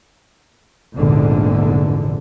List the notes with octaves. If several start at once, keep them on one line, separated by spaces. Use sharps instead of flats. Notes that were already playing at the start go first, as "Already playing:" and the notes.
F1 A#1 E2 G#2 D3